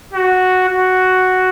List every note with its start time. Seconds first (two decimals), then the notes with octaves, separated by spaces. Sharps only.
0.13 F#4
0.69 F#4